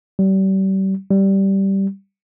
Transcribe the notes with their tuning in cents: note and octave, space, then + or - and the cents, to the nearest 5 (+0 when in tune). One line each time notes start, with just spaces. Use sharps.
G3 -35
G3 -10